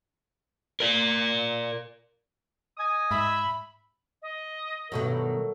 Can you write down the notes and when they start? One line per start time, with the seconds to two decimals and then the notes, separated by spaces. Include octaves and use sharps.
0.80 A#4 D5
2.77 D#5 G#5 D#6
3.11 G#2 E5 B5
4.22 D#5
4.92 G2 B2 D#3 F#3 A3 A#4